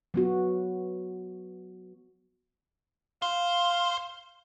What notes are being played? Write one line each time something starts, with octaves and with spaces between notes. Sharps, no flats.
F#3 B3 F#4
C5 F5